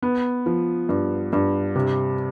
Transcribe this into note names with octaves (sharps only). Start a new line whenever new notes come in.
B3
F3
G2
G2
C3